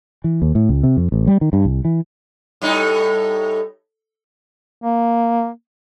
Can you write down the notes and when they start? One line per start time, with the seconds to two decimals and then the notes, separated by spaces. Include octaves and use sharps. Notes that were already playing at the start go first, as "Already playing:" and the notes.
0.24 E3
0.42 D#2
0.55 A2
0.69 C#2
0.83 C3
0.97 F2
1.12 A1
1.27 G3
1.41 D#3
1.53 G2
1.65 C2
1.85 E3
2.62 A2 G3 D#4
4.83 A#3